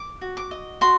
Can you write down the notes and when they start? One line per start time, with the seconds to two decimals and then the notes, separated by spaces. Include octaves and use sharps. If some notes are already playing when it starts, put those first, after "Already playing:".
Already playing: D6
0.21 F#4
0.37 D6
0.51 D#5
0.81 F#4 C6